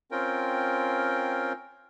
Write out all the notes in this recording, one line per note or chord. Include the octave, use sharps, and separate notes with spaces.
C4 C#4 F4 A#4 G5